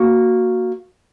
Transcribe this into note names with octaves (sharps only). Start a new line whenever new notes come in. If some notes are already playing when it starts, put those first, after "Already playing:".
Already playing: A#3 F#4